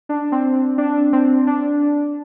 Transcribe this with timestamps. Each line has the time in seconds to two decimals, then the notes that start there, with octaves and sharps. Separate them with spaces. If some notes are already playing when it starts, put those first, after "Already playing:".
0.09 D4
0.32 C4
0.78 D4
1.13 C4
1.47 D4